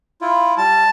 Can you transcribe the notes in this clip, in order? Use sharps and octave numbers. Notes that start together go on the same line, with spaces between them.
E4 F4
G3 A5